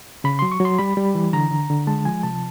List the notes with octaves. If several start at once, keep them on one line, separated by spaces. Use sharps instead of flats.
C#3 B5
F#3 C6
C#6
F#3 C6
G3 B5
G3
E3
D3 A#5
D3
D3
G#3 A5
F3 G#5
C3 A5